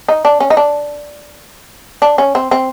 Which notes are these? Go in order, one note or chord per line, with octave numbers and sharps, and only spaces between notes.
D#4
D4
C#4
D#4
D4
D4
C#4
C4
C4